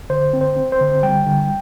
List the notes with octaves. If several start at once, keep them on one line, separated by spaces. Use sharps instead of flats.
D3 C5
C4
C5
C4
C5
D3
G3 G5
D3